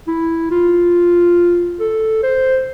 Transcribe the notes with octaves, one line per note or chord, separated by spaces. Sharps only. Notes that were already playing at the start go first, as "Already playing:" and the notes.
E4
F4
A4
C5